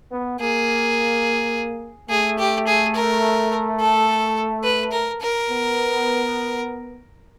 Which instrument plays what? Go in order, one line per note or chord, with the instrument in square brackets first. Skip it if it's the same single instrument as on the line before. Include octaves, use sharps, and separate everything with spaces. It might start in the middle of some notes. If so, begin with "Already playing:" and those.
[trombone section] B3
[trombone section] A#3 [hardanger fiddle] G#4
[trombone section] A3 [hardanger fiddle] G#4
[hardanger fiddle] G4
G#4
A#4
A4
B4
A#4
A#4
[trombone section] B3